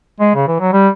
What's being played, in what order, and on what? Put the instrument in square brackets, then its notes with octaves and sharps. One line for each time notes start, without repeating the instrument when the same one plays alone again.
[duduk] G#3
C#3
E3
F#3
G3